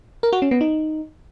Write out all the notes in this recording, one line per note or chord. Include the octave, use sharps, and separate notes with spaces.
A#4
F#4
C#4
B3
D#4